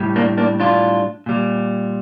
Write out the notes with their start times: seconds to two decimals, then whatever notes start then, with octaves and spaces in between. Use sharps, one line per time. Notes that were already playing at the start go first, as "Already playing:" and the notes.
Already playing: A2 G3
0.16 A#3 D4
0.37 A#3 D4
0.60 D4 F4
1.26 A#2 G3